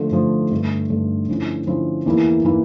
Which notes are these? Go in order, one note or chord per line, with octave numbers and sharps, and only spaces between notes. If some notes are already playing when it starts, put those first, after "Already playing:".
Already playing: D3 F3 A3
D3 F3 A3
G2 D3 A3
G2 D3 A3
D3 F3 C#4 E4
D3 F3 C#4 E4
E2 E3 A#3 E4
E3 A#3 E4